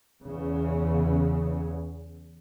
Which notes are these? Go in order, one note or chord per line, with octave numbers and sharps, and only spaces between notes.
E2 C#3